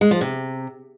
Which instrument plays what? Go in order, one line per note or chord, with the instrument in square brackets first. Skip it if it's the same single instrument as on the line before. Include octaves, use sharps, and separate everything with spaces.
[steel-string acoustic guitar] G#3
F3
C3